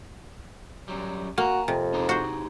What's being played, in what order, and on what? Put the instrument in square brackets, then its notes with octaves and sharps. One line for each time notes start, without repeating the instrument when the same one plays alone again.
[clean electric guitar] F#2 F#3 G3
[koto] A#3 [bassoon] F#4 [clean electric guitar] G#5 A#5
[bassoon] F2 [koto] C3
[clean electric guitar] D#4 G4 G#4
[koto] F#4 C5